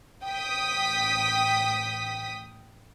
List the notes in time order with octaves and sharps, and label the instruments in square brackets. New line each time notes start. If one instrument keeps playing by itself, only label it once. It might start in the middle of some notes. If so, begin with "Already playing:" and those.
[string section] A1 G5 D#6 B6